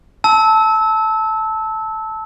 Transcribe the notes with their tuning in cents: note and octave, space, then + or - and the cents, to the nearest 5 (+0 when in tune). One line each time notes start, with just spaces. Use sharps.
A5 +0 E6 -20